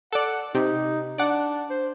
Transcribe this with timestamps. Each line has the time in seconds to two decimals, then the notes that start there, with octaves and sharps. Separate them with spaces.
0.13 A4 D5 F#5
0.55 C3 D#4
1.18 D4 D5 F#5
1.70 C5